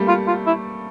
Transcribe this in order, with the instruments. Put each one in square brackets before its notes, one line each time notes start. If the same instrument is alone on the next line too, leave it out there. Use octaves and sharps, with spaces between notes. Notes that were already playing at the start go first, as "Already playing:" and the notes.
Already playing: [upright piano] G3 A3 A#3
[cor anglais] F4
F4
E4